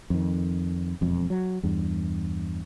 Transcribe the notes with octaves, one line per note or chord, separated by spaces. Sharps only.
F2 D#3
E1 F2
F#3
E2 G2